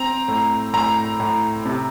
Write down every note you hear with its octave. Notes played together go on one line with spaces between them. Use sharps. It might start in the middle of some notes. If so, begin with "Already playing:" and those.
Already playing: C4 A#5
A2
A2 A#5
A2
C3